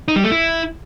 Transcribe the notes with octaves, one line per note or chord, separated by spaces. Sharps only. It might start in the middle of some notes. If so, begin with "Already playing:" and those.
D#4
G3
A3
E4